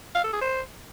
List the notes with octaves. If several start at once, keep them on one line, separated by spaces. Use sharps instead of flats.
F5
A4
G#4
C5